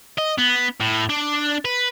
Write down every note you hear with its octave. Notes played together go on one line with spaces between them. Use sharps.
D#5
B3
A2
D4
B4